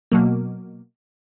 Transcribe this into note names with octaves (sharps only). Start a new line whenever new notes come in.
B2 F#3 A#3